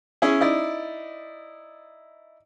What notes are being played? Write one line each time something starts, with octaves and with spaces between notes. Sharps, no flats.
C#4 E4 G#4
D#4 E4 D5